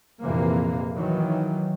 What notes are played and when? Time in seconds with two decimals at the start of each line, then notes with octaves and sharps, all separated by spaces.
0.23 A#1 F2 C3 E3 A#3
0.95 D#3 E3 F#3